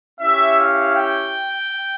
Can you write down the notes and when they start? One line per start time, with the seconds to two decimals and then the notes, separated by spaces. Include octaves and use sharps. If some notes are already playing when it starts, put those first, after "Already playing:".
0.18 C#4 E4 G4 E5
0.56 F5
0.93 G5